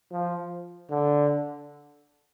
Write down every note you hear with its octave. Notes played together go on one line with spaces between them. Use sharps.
F3
D3